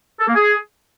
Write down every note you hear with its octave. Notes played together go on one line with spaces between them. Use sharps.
A4
A#3
G#4